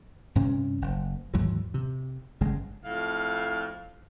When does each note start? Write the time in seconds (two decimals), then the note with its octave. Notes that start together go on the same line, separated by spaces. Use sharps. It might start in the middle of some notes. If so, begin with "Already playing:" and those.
0.35 G2 C3 C#4
0.82 F#1
1.34 D#2 G#2 E3 F#3
1.74 C3
2.41 G1 C#3 G#3
2.85 F2 A2 F5